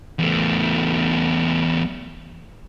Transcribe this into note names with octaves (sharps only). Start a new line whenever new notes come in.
E2 A3